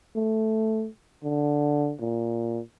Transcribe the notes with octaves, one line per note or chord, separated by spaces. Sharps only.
A3
D3
A#2